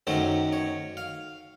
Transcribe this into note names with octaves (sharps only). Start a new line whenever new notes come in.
F#2 D#3 F#3 A3 C#4 C5
C#5
F5